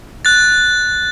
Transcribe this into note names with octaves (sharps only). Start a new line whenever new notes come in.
F#6 A6